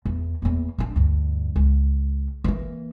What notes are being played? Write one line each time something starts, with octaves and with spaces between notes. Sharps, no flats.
E2
E2 A#3
C#4 D4
D2 G2
C#2
E3 A#3